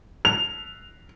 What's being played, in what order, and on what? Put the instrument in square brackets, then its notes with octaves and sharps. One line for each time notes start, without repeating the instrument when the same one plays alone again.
[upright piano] F7